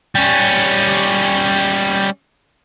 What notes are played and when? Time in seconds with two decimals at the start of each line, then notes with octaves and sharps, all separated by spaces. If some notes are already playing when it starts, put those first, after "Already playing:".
0.15 G3 C#4